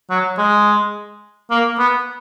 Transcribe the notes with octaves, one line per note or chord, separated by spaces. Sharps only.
F#3
G#3
A#3
B3